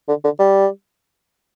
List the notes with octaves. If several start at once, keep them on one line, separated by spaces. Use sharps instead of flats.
D3
D3
G3